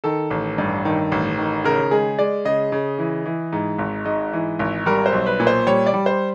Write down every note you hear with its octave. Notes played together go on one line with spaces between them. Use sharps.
D#3 A4
A1
G2
D#3
A1
D#3
C#3 A#4
G#3 G#4
G#3 D5
C#3 D#5
C#3
E3
E3
G#2
G#1
G#2 D#5
E3
G#1
G3 A#4
C5
B1
B4
A#2
C5
G3 C#5
D5
G3
C5